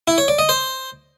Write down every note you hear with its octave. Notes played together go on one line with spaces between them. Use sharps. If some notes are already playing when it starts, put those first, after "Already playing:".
E4
C#5
D5
D#5
C5